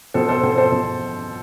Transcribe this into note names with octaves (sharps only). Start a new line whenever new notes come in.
B2 A4 C5
A4 C5
B2 A4 C5
A4 C5
B2